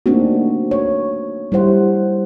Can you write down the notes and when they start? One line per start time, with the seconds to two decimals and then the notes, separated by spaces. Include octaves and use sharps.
0.06 A3 A#3 C4 D4 D#4 F#4
0.71 C#5
1.52 G3 E4 C5 F#5